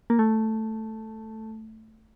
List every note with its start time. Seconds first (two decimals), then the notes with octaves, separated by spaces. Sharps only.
0.10 A#3
0.19 A3